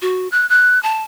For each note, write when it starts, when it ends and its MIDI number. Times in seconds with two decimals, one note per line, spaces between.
0.02 0.28 66
0.32 0.48 90
0.49 0.81 90
0.83 1.03 81